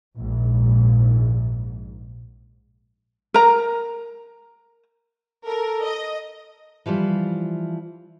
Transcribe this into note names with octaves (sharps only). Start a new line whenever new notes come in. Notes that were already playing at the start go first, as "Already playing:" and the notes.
A#1 G#2
A#4 A#5
A4 A#4
D#5
E3 F3 G3 F4